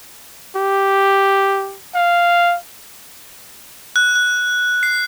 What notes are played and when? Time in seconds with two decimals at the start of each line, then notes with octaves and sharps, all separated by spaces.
0.56 G4
1.95 F5
3.96 F#6
4.15 F#6
4.83 C7